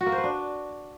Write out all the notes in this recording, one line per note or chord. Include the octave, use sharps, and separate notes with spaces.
F#4
A#3
C5
B4
D4